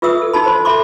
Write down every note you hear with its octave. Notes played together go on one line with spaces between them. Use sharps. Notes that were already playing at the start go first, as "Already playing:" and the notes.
F4 G#4 B4 E5 D#6 E6
A4
D#4 F#4 A5 B5
C5 B5 C6
A4 E5 B5 C6 D6